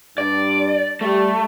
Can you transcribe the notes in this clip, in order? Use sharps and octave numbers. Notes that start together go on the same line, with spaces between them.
G2 D4 D5
G3 A3